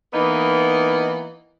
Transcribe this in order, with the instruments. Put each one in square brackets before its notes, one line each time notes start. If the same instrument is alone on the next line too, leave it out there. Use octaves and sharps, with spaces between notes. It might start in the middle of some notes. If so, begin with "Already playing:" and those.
[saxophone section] E3 A#3 B3 D#4